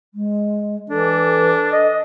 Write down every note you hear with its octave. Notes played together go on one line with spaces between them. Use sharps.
G#3
E3 D4 A4
D#5